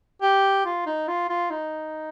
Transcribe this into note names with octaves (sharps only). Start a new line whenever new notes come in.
G4
F4
D#4
F4
F4
D#4